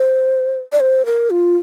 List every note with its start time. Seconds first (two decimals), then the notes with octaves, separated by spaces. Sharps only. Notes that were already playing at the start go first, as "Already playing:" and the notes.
Already playing: C5
0.72 D5
0.80 C5
1.06 A#4
1.30 F4